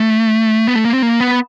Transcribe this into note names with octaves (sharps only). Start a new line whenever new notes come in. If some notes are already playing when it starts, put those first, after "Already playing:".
Already playing: A3
B3
A3
A#3
C4
A#3
B3